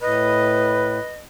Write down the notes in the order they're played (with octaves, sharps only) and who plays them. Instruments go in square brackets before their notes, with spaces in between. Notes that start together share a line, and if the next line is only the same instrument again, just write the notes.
[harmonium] A2 [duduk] B4 [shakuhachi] D#5